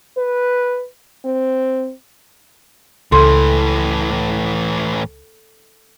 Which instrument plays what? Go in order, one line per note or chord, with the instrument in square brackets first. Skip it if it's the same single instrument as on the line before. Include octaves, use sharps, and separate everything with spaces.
[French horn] B4
C4
[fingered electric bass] C#2 [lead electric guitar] A2 E3 [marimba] A4 C6